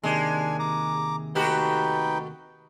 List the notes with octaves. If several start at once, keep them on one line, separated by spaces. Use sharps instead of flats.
D#2 C3 D#3 G#3 D4 G#5
A#5 D6
A3 D#4 F#4 G4 B4 G5